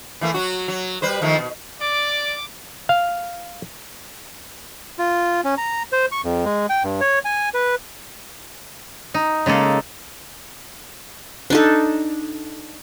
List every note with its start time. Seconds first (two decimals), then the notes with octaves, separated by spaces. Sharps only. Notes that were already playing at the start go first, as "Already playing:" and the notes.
0.21 E3 A3 A#3
0.34 F#3 F#4
0.68 F#3
1.02 G3 B4 C5
1.22 D#3 F3 A3
1.39 B2
1.81 D5 D6
2.89 F5
4.99 F4
5.44 C#4
5.58 A#5
5.92 C5
6.12 C#6
6.24 F2
6.45 G#3
6.70 G5
6.84 G2
7.01 C#5
7.25 G#5
7.54 B4
9.14 D#4
9.46 C#3 G#3 A#3 A4
11.50 D4 D#4 A4